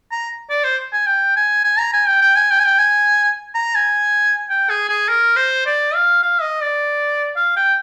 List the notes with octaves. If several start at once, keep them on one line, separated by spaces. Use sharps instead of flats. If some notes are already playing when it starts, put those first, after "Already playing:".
A#5
D5
C5
G#5
G5
G#5
G#5
A#5
G#5
G5
G5
G#5
G5
G#5
G5
G#5
A#5
G#5
G5
G#4
G#4
A#4
C5
D5
F5
F5
D#5
D5
F5
G5